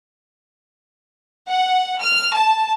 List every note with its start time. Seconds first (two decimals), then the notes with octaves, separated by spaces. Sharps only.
1.47 F#5
2.01 F6
2.35 A5